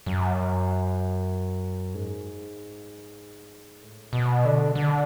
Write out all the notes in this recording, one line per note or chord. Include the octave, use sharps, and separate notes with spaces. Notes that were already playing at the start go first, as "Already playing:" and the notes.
F#2
G#2
A2
B2
D3
D3